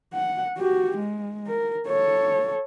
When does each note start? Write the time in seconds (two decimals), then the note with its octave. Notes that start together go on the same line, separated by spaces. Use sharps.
0.14 F#5
0.58 F#4 G4
0.97 G#3
1.47 A#4
1.88 A4 C#5